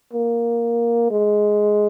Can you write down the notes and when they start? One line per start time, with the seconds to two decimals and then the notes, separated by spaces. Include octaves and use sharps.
0.13 A#3
1.10 G#3